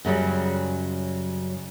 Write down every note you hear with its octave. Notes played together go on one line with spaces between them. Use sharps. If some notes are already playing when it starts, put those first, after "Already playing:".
F#2 C#3 F#3 G3